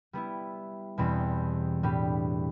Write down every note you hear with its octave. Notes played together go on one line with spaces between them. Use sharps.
G3 B3 E4
E2 B2 G3 C4
A2 G3 D4 G4 B4